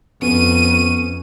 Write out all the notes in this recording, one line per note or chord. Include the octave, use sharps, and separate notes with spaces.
F2 B3 C#4 D#7